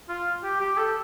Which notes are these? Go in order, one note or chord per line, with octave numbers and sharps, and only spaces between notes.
F4
G4
G4
A4